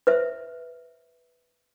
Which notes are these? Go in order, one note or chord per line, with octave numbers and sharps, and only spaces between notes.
B4 C5 E5